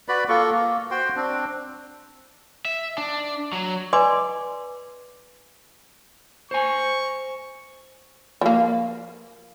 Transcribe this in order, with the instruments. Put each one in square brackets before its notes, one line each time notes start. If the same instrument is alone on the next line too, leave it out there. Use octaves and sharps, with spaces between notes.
[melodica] F#4 B4 D5 B5
A#3 F4 A4 C#6
A#3
F#4 C5 G5 C6
C4 D4
[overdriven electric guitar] E5
D4
F#3
[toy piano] B4 D5 D#5 G#5 C6 D6
[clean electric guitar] C5 G#5 [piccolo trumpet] C#6
[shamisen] F3 A#3